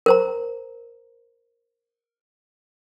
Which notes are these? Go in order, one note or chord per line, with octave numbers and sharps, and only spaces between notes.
A#4 C5 A#5